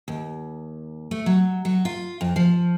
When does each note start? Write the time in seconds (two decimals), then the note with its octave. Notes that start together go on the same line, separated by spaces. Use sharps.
0.08 D#2
1.11 A3
1.26 F#3
1.65 F#3
1.85 F4
2.21 F2
2.36 F3